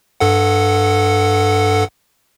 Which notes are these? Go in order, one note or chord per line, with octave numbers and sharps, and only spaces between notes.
G2 A4 F#5